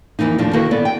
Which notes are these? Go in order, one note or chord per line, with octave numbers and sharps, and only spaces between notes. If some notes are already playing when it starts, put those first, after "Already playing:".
F2 G#2 E3 A#3 D#4
D#2 A#2 F3 A3 D4
D#3 A#3 E4 F#4 A4 B4
B3 A4 D5
G5